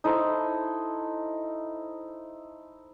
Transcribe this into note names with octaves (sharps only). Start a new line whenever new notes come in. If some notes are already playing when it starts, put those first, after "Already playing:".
D#4 E4 A4 C5